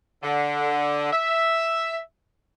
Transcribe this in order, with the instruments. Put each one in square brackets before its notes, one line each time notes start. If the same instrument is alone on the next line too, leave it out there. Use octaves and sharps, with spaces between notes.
[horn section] D3
E5